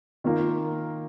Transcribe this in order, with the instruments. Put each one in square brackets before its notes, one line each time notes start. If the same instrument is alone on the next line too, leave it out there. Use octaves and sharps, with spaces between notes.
[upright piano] D#3 A#3 F4 A#4